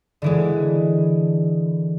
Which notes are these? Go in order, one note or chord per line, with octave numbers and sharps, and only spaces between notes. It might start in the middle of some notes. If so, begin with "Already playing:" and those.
D3 E3 G#3